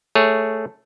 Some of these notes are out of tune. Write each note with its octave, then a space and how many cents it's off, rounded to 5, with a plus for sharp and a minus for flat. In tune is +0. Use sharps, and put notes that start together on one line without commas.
A3 +0 G#4 +0 C#5 +0